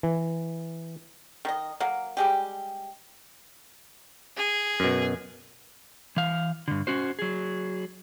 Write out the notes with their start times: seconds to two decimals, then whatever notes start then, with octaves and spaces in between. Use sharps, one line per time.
0.03 E3
1.45 D#3 D#5
1.80 F#3 A#3
2.17 G3 G#3 G4
4.37 G#4
4.80 F#2 B2
6.17 E3 F5
6.68 G2 D3
6.87 C#4 F#4 C5
7.19 F#3 G#4